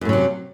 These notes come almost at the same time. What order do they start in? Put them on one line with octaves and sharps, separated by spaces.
F#2 A2 F#3 C3